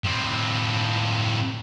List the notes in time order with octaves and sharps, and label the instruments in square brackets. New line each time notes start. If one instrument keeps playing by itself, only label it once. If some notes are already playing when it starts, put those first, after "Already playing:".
[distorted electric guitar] A2 C4